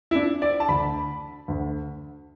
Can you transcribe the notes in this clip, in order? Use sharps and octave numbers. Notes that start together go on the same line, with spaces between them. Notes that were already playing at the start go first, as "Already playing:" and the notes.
E4
D4
D5
A5
D2 D3 B5
D2 D3